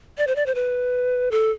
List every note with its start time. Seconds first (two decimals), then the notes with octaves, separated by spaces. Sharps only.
0.18 D5
0.27 C5
0.36 D5
0.46 C5
0.55 B4
1.31 A4